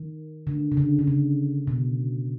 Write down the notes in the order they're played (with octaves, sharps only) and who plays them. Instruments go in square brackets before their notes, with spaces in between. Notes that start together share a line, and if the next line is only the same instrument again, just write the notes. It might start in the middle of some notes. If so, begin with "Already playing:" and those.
Already playing: [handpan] D#3
D3
C#3
D3
D3
C#3
B2